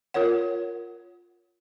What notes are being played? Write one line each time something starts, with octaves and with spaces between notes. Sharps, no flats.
F4 A#4 C#5 F#5